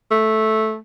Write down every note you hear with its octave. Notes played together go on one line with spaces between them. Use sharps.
A3